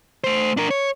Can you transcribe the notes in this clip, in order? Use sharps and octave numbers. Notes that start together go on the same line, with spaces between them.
A3 C5
D4 A#4
C#5